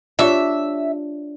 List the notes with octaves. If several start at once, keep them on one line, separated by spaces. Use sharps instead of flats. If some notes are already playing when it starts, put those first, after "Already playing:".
D4 F4 G4 C#5 E5